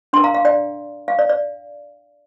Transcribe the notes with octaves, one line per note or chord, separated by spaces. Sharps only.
D4 A#4 G5 C6
F5 A#5
F5
D5 G5
F5
D5
D5